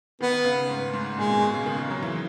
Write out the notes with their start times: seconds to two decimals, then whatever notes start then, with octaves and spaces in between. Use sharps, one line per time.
0.21 D#3 B3
0.44 C#3
0.69 G#2
0.94 G#2
1.17 A#2 G#3
1.30 B2
1.42 B2
1.54 C#3
1.66 D#3
1.79 D#3
1.91 F#3
2.03 E3